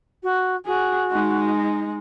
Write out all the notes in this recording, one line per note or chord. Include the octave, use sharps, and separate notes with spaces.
F#4
F#4 G#4
G#3 D#4